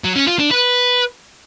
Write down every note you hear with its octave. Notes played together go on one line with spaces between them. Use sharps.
F#3
C#4
F4
D4
B4